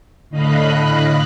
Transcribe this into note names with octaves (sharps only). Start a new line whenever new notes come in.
A2 D3 D#5 F5 B5 F#6